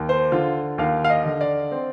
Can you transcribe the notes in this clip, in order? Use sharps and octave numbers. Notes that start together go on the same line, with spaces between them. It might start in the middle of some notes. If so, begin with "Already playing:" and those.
Already playing: D#2
C5
D3 F4
D#2 F5
F5
D#5
D3
D5
C4